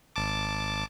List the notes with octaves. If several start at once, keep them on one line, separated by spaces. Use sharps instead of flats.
G#1 A5 D6